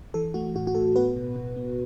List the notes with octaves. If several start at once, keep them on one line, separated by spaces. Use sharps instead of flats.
E3 A4
A3 F#4
A2 F#4
F#4
A2 A4
B3 F#4 B4
B2
B2
B3